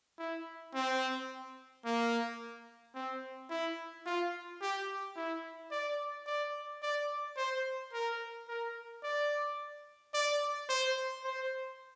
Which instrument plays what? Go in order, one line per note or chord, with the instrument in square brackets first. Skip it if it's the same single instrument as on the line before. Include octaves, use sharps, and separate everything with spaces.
[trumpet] E4
C4
A#3
C4
E4
F4
G4
E4
D5
D5
D5
C5
A#4
A#4
D5
D5
C5
C5